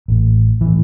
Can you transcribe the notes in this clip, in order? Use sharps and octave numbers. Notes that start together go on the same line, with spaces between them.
A1 A2
A2 E3